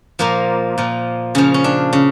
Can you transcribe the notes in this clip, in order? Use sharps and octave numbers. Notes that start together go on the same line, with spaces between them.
A#2 F3 A#3
A#2 F3
C#3 F3 C#4
C#4
D4
C#3